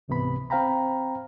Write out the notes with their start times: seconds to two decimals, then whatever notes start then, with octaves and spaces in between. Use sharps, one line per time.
0.08 C#2 G#2 C3 E3 B3 B5
0.50 C4 C5 F5 G5 A#5 B5